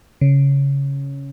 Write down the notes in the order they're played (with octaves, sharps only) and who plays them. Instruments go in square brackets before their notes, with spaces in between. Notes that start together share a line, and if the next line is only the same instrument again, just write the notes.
[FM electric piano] C#3